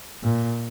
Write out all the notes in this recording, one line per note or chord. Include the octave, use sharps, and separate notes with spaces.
A#2